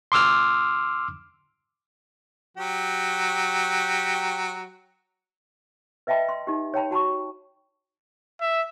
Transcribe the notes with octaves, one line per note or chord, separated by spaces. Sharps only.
C6 D6 E6 F6
F#3 G4
B4 D#5 E5 G5 A5 B5
C6
D#4 G4
C#5 G5 A5 B5
F#4 A5 B5 C#6
E5